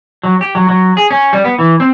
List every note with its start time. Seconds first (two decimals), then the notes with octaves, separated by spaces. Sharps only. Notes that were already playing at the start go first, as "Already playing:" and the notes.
0.23 F#3
0.41 G4
0.55 F#3
0.69 F#3
0.97 G#4
1.10 C#4
1.33 G3
1.44 B3
1.59 E3
1.80 C4